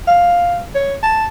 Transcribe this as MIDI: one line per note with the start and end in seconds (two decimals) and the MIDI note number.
0.07 0.59 77
0.75 0.94 73
1.03 1.25 81